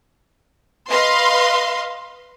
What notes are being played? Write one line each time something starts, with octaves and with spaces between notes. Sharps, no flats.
B4 D#5 F5 C6